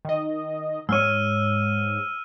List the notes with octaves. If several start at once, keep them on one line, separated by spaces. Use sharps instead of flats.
D#3 D#5
G#2 G#3 C#5 E6 F6 D#7